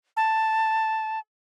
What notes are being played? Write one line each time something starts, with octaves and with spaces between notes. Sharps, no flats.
A5